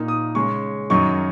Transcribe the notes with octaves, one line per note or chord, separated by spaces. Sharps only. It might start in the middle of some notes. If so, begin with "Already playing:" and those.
Already playing: A#2 A#3 D#4
D#6
C#3 G#3 C#4 C#6
F#2 D#3 F#3 D#4 C#6